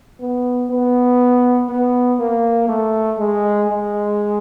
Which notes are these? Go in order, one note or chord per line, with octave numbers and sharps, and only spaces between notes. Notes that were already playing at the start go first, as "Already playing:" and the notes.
B3
B3
B3
A#3
A3
G#3
G#3